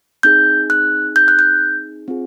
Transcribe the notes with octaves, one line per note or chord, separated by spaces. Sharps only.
C4 D#4 G#4 G6
F#6
G6
F#6
G6
C4 F4 G#4